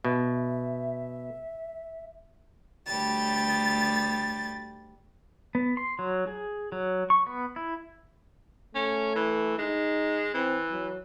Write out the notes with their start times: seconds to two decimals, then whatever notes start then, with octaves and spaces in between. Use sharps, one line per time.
0.05 B2 E5
2.88 D2 G3 A6
5.55 B3
5.77 C6
5.99 F#3
6.27 G#4
6.72 F#3
7.10 C#6
7.27 B3
7.56 E4
8.75 A3 C#4
9.15 E3
9.58 G#3 D#4
10.34 E3 C4
10.71 F#3